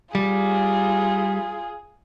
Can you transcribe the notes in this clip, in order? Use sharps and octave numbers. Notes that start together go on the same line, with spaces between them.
G3 F4 G#4